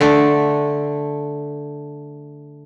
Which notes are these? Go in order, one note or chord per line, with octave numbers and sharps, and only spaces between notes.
D3 A3